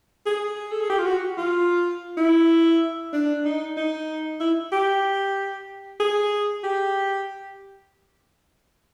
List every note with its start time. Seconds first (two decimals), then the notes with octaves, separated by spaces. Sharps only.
0.26 G#4
0.71 A4
0.81 G#4
0.90 G4
0.98 F4
1.05 F#4
1.38 F4
2.17 E4
3.13 D4
3.45 D#4
3.77 D#4
4.40 E4
4.72 G4
6.00 G#4
6.64 G4